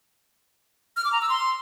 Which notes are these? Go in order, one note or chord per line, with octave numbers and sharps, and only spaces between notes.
F6
D6
A#5
E6
C6